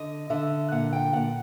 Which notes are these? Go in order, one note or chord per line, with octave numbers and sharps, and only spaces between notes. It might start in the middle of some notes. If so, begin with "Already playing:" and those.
Already playing: D3 D#5
D3 E5
A#2 F#5
G5
A#2 F#5